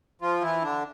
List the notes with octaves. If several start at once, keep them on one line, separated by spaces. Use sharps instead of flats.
F3 F4
E3 E4
D3 D4